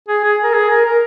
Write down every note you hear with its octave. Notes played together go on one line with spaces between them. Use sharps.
G#4
G#4
A#4
G#4
A#4
A#4